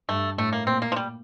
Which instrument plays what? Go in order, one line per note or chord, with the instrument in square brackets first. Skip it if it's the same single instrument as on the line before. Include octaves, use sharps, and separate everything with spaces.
[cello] G2 [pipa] A3
[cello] A2 [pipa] A3
[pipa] A#3
[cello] A#2 [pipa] C4
[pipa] A#3
F3
G3